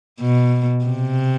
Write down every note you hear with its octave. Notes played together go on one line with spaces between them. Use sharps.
B2
C3